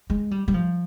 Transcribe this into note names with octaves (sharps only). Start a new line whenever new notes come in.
G#3
G3
G3
F3